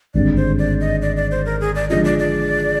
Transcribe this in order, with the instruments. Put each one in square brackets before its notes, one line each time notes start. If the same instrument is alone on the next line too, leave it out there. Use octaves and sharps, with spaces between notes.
[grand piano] G#1 G2 D3 G#3 C4 [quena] D5
[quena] C5
D5
D#5
D5
D5
C5
A#4
G#4
D5
[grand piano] D3 F3 G#3 D4 F4 [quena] D#5
[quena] D5
D5